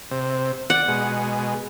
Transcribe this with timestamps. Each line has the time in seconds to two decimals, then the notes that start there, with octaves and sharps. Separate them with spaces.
0.11 C3
0.70 D5 F#5
0.88 B2 G#3